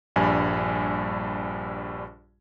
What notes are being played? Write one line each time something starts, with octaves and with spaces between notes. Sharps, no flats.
A#1 G2 G3 G#5